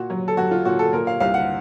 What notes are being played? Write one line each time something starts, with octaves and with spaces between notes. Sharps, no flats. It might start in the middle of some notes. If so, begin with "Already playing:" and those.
Already playing: A#2 F#4
F#3
A4
F#3 F#4
F4
A#2 F#4
A4
A#2 A#4
F5
C2 F5
F#5